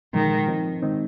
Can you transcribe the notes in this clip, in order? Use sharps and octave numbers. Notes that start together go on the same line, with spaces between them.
A#2 D#3 F3 G#3
F3 C4 D#4
D#3 G#3 C4 D#4